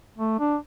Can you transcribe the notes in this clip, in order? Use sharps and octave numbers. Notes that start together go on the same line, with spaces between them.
A3
D4